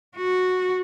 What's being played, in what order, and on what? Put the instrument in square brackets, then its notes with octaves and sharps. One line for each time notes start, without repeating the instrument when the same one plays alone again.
[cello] F#4